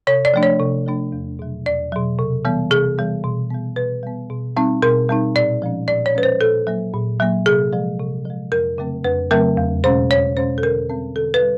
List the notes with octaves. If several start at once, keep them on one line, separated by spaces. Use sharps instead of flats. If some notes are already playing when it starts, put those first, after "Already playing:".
C3 C#5
D5
F3 A3 D4
C#5
C3
F3 A3 D4
E2
B2 F#3
E2 D5
B2 F#3
C3
E3 G3 B3
C3 G#4
E3 G3 B3
B2
G3 B3
B2 B4
G3 B3
B2
G3 C4 D#4
B2 A#4
G3 C4 D#4
A#2 D5
F3 G#3 C#4
A#2 D5
C#5
F3 G#3 C#4 B4
C5
A#2 A4
F#3 A#3
A#2
F#3 A#3
C3 G#4
F3 G#3
C3
F3 G#3
F2 A#4
C#3 F#3 A3 C4
F2 B4
C#3 F#3 A3 C4 A#4
E2
B2 G#3 C#4 C5
E2 C#5
B2 G#3 C#4 C5
A4
D3 A#4
G3 C4
D3 A4
B4
G3